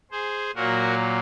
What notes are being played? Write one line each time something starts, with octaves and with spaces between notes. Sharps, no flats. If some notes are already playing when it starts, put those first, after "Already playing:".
G#4 C5
A#2 F#3 A#3 F#4 A#4